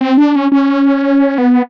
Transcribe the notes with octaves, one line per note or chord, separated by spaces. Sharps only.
C4
D4
C#4
C#4
B3